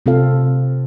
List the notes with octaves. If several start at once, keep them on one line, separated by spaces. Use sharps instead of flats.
C3 C4 F4 A4 F5